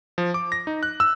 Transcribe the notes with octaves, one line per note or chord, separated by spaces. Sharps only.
F3
D6
A#6
D#4
F#6
E6